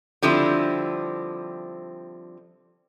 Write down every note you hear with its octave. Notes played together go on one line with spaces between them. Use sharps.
D3 F3 G3 C4 E4